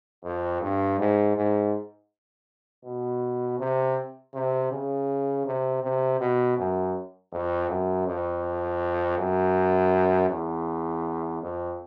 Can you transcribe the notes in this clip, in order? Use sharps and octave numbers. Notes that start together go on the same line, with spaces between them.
F2
G2
G#2
G#2
B2
C3
C3
C#3
C3
C3
B2
F#2
F2
F#2
F2
F#2
E2
F2